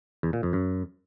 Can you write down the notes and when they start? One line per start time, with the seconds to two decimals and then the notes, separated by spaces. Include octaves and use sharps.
0.23 E2
0.33 A#2
0.43 F2
0.53 F#2